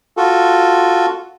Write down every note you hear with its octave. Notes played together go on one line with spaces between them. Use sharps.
F4 F#4 A4